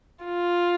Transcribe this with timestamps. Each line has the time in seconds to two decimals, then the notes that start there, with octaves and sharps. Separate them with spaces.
0.25 F4